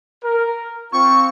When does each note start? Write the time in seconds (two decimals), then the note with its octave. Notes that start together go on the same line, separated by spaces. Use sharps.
0.23 A#4
0.93 C4 F4 C#6